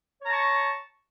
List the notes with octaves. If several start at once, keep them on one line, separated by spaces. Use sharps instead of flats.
C#5 A5 A#5 C#6